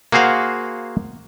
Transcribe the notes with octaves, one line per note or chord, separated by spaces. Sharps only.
A#3 F#4 G#4 C5 F5 F#5